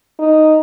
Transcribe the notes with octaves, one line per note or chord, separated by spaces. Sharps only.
D#4